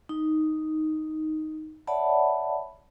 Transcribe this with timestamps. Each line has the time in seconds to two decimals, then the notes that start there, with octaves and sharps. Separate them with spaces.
0.09 D#4
1.87 C#5 D5 E5 F#5 A5 B5